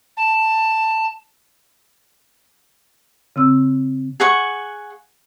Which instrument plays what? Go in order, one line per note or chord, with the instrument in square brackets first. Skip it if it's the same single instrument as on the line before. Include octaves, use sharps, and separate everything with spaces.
[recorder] A5
[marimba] C#3 C4 E6
[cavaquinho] G#4 F#5 C#6